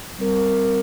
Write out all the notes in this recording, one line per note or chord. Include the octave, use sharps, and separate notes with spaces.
G3 C4 A#4